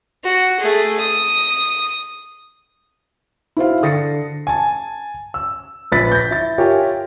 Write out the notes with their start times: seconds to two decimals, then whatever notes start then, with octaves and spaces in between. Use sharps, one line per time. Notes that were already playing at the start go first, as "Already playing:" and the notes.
0.24 F#4
0.59 A3 G#4
1.00 D#6
3.57 E4 F#4 C5 F5
3.82 D3 D#6 A6 A#6 C7 C#7
4.47 G#5 A5
5.34 E6
5.92 A#1 B4 A6 B6
6.12 G6 A#6
6.31 E4 A6
6.58 F4 G4 A#4 C#5 E5 G#5